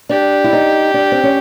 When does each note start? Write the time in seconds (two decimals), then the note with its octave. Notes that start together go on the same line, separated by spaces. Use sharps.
0.09 D4 G4
0.44 E4
0.53 D#4
0.94 D4
1.12 C4
1.23 C#4